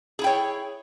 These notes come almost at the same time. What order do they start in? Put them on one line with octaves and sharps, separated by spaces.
G#4 E4 G5 C#5